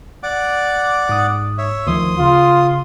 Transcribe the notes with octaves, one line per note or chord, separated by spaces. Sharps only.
D5 F#5 D6
G#2 D#6
C#5 E5
D2 D#3 F3 C6 D#6
C#3 F4